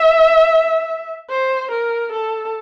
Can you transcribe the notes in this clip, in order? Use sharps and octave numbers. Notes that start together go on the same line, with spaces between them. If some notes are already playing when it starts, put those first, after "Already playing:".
Already playing: E5
C5
A#4
A4